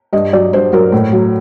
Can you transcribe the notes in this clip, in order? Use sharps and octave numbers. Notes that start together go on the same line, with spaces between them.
G2 D#5
F#3 D5
G2 C5
F#3 A#4
A2
F#3